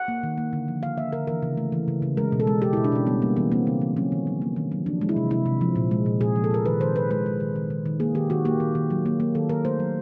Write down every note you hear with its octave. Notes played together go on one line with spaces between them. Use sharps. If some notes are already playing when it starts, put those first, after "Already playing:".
Already playing: F#5
A#3
D#3
A#3
D3
F3
D3 F5
A#3 E5
D3 A#4
E3 A#4
C#3
A3
E3
C#3
C#3
G#3 A#4
B2
A4
G#3
G#3 G4
B2 E4
D4
B2 C#4
G3 B3
G3 A#3
E3 B3
A#3 C4
C#3 B3
E3
F#3 C#4
D#3
F#3
A#3
D#3
F#3
F3 D4
G#3
E4
C3
C3 E4
C3
F3
A#2
G#3
A#2
A#2 G#4
F3
A4
A#2 A#4
D#3 B4
D#3 C5
D#3 B4
G#3 B4
G#3
D#3
D#3
D#3
D#3
A#3 G#4
D#3 G4
D#3 F#4
A#3 G4
D#3
D#3
F#3
A#3
A#3
D#3 A4
D#3 A#4
A3 C5
F#3